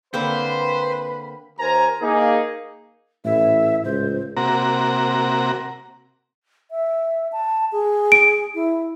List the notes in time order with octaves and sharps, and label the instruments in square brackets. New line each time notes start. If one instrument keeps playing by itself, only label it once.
[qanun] D3 A#3 C4 [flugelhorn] B4 [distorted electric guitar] C5 [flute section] B5
[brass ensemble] D#2 A#4 C5 G#5 A#5
A#3 D#4 G#4
[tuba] A1 [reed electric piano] A2 [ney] E5
[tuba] C#2 [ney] C5
[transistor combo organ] C3 A#3 F#4 A#5
[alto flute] E5
A5
G#4
[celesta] D7
[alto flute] E4